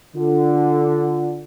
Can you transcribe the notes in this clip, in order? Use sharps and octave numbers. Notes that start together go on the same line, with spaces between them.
D3 F4